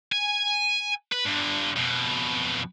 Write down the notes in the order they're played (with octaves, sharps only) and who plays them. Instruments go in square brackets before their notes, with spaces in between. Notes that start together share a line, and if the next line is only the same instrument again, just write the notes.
[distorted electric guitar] G#5
B4
G2 D3
F2 B2